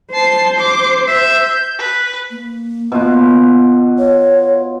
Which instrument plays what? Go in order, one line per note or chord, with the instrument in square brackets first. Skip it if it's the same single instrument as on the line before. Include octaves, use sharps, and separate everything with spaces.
[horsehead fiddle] C5 [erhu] A5 [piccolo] C7
[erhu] D6 [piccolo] C7
[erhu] E5 [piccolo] G6
[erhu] B4
[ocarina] A#3
[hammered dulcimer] B2 F4 F#5
[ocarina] C#5